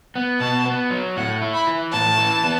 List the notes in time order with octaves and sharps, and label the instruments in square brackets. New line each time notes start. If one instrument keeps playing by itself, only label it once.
[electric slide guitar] B3
[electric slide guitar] B2 [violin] A5
[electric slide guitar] B3
F#3
[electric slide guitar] A2 [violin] F#5
[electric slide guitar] E4
[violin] B5
[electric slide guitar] E3
[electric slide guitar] A2 [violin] A5
[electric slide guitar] E3
B3